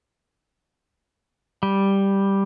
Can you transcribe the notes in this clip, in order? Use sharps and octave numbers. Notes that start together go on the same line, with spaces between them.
G3